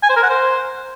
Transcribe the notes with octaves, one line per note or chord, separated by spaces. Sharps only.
G#5
C5
A#4
F#5
C5